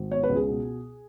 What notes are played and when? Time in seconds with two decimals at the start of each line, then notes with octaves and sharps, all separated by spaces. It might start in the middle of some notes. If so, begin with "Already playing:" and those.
Already playing: G#1
0.11 B3 C#5
0.23 B4
0.29 C#2
0.35 G#4
0.47 B2